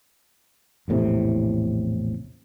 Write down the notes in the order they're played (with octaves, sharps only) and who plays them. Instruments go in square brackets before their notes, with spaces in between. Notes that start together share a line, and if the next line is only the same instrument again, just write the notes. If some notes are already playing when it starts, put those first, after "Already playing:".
[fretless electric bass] A#1 E2 A2 C3